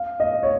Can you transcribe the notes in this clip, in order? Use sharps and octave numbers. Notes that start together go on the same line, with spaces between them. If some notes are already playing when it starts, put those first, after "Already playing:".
Already playing: F5
D#5
C#5